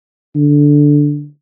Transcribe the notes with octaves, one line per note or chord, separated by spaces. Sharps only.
D3